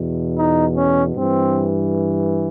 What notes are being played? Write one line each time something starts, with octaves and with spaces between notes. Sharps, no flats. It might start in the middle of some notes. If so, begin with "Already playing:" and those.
Already playing: E2 B2
D#4
C#4
G2 E3 C4